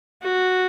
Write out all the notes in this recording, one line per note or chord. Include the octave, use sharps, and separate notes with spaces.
F#4